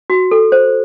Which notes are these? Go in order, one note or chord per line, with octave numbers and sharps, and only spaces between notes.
F#4
A4
C5